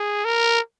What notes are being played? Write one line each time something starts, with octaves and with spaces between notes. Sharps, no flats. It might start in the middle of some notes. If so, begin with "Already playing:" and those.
Already playing: G#4
A#4